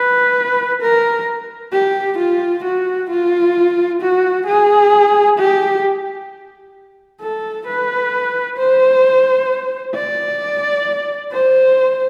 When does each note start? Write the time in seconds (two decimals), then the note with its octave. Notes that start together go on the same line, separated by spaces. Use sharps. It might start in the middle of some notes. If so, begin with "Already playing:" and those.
Already playing: B4
0.82 A#4
1.73 G4
2.18 F4
2.64 F#4
3.10 F4
4.01 F#4
4.47 G#4
5.39 G4
7.21 A4
7.67 B4
8.58 C5
9.95 D5
11.32 C5